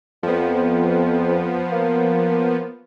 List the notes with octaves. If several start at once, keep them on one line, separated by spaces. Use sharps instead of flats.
F2 F3 B3
A#3